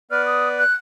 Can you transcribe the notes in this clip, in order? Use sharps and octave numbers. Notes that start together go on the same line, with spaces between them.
B3 B4 D5 F6
D#6
F#6